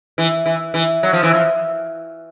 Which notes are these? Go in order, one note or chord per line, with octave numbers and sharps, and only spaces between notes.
E3
E3
E3
F#3
F3
E3
F3